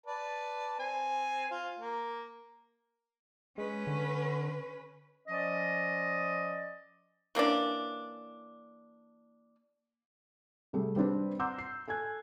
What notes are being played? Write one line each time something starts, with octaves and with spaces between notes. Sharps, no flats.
B4 D5 A5
C4 G#5
F4
A#3
G#3 C#4 B4
D3
F3 C#4 D5 D#5
E3 A#3 C#4 D4
C3 G3 A3 G#4
G3 C4 D4 B4
F#5 A#5 C6 D6 E6 G6
C7
A4 G#5 F#6 G#6